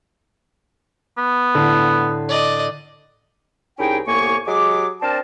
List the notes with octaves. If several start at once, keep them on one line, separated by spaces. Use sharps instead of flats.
B3
A2 D3
D5 D#5
C2 C#4 D#4 E4 G#4 G5
C2 A2 A#3 B3 G#5 C#6
F#3 G#3 G4 G#4 D6
C4 D4 A#4 A5